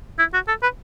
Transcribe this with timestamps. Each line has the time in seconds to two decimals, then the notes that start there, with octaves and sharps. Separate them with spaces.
0.19 E4
0.34 F#4
0.48 A4
0.63 B4